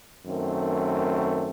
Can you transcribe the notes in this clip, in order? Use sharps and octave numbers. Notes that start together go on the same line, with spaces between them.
F#2 D#3 A3 C4